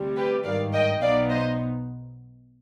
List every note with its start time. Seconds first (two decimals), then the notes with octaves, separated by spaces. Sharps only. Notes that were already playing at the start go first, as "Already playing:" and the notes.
Already playing: D2 C3 G3
0.16 G4 B4
0.44 G#1 G2 D#3 D5 F5
0.73 D#5 G5
1.01 B1 B2 B3 D#4 D5 F5
1.30 C5 D#5